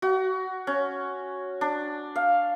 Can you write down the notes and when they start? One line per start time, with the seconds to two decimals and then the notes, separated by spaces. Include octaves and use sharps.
0.02 F#4
0.67 C#4
1.61 D4
2.16 F5